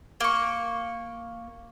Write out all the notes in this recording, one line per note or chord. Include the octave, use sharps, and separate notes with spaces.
A#3 C#6